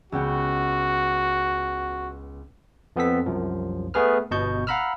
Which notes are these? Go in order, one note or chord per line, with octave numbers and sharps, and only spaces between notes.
C#2 B3 F#4 G5
F2 B3 C4 A4 B6
C2 F#2 F3
A3 B3 G#4 B4 F6
G1 B2 D#5 A5 C#6 G6
F5 F#5 A#5 B5 E6 F6